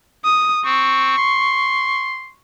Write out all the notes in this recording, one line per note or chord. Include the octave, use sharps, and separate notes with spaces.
D#6
C4 C#6
C6